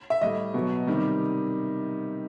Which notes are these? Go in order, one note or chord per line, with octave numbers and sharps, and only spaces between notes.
E5
A2 G3 D#5
B2 F#3
C3 D#3 G3